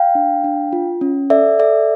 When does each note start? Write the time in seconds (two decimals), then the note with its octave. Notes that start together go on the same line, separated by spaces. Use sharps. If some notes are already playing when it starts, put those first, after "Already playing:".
Already playing: F5 G5
0.15 D4
0.44 D4
0.73 F4
1.01 C#4
1.30 A4 D5 E5
1.59 A4 D5 E5